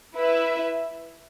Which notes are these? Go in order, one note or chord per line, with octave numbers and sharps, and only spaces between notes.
E4 B4 E5